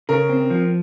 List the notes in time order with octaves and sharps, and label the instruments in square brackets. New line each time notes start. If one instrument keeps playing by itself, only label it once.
[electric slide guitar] C#3 [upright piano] A#4
[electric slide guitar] C4
F3